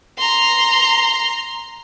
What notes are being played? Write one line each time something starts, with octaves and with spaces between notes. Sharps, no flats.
A#5 C6